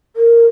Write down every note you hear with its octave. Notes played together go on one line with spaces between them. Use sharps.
A#4